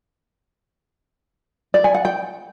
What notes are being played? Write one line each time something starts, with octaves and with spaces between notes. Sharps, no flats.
D5
G#5
F#5
G5